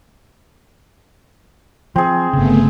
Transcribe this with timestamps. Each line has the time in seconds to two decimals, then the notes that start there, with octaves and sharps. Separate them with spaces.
1.96 F3 C4 G#4
2.33 G1 C#3 A3 B3